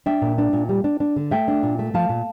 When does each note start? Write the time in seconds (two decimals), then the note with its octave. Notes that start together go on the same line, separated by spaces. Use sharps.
0.06 D4 E5 G5
0.22 A#2
0.38 D4
0.53 A#2
0.69 G3
0.84 D4
1.00 D4
1.16 D3
1.31 A3 E5 G5
1.48 D4
1.63 A#2
1.79 A3
1.94 F3 F5 A5
2.09 A#2